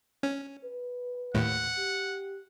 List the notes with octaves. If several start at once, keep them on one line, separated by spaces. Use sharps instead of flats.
C#4
B4
D#2 A2 F#5
G4